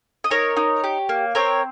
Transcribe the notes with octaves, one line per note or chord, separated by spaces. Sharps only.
D#5
D#4 A#4 C#5
D#4
G4
A#3
C4 A#4 C#5